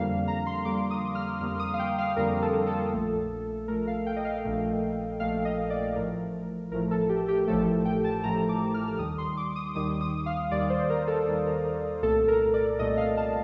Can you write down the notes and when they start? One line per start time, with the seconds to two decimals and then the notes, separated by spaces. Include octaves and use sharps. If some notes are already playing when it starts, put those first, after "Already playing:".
Already playing: F2 D3 G3 A#3 F5
0.28 A#5
0.47 C6
0.65 F2 D3 G3 A#3 D6
0.90 D#6
1.15 F6
1.40 F2 D3 G3 A#3 F6
1.59 D#6
1.74 F5
1.79 G5
1.98 F5
2.16 F2 D3 G3 A#3 A#4
2.42 A4
2.67 A4
2.93 A#1 A#2 A3
3.68 A#1 A#2 A3 A#4
3.87 F5
4.06 G5
4.16 D#5
4.25 F5
4.45 A#1 A#2 A3
5.20 A#1 A#2 A3 F5
5.45 D#5
5.70 D5
5.96 A1 A2 F3 A3 A#4
6.71 A1 A2 F3 A3 A#4
6.91 A4
7.09 G4
7.28 G4
7.47 A1 A2 F3 A3 A4
7.85 G5
8.04 A5
8.24 A1 A2 F3 A3 A#5
8.49 D6
8.74 F6
8.99 D#2 D#3 G3 D#6
9.18 C6
9.37 D6
9.56 D#6
9.75 D#2 D#3 G3 D#6
10.01 D#6
10.26 F5
10.51 D#2 D#3 G3 D5
10.70 C5
10.90 A#4
11.07 A4
11.27 D#2 D#3 G3 A4
11.46 A#4
11.65 A#4
12.02 C2 A#2 A3 A4
12.28 A#4
12.54 D5
12.79 C2 A#2 A3 D#5
12.97 F5
13.17 A5